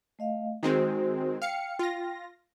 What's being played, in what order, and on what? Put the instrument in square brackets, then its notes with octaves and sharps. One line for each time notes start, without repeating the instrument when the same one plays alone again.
[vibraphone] A3 D#5 F5
[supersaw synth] D#3 G#3 C4 [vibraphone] F#4 C5
[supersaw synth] F5 C#7 [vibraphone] G5
[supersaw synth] F4 A#6